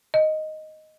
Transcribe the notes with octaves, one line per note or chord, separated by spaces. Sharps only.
D#5